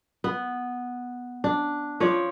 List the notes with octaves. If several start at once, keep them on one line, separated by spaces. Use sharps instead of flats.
B3
D4
F3 C#5 D5